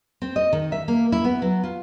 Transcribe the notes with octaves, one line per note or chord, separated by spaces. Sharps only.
C4
D#5
D#3
E5
A#3
E4
B3
F#3
F4